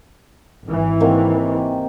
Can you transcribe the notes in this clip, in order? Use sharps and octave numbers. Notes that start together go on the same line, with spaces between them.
G#1 E3
C3 D#3 A#3